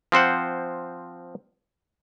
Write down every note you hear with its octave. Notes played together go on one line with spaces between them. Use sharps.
F3 C4 C5 F#5